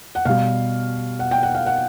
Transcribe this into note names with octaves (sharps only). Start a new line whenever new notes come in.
F#5
B2 G3 F5
F#5
G5
F#5
F5
F#5